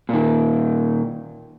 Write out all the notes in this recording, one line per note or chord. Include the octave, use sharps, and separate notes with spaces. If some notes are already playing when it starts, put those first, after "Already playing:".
A#2 D#3